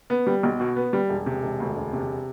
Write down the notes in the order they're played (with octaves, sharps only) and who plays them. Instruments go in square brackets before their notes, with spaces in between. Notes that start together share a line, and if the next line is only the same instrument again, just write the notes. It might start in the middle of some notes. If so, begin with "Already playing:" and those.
[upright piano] B3
G3
B1
B2
B3
G3
E1
C3
E1
D2
E1
C3